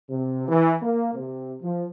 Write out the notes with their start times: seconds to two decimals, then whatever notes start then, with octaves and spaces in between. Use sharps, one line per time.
0.10 C3
0.49 E3
0.81 A#3
1.13 C3
1.61 F3